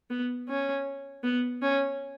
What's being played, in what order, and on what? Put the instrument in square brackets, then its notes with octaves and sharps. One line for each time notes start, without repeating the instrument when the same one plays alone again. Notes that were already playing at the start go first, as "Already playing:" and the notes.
[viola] B3
C#4
B3
C#4